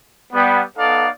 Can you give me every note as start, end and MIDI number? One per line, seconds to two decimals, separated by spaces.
0.33 0.61 55
0.33 0.61 59
0.78 1.08 59
0.78 1.08 63
0.78 1.08 69
0.78 1.08 74
0.78 1.08 77